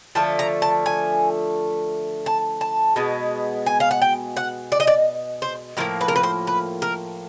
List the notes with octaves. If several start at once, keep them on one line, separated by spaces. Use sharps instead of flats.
D3 F3 A3 A5
A#5
A5
G#5
A5
A5
B2 G#3 B3
G#5
F5
F#5
G5
F#5
D5
D#5
D5
C5
A2 F3 A#3 A#4
B4
A#4
B4
C5
B4
A#4